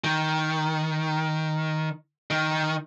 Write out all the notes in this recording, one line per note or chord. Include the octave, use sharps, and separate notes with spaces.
D#3
D#3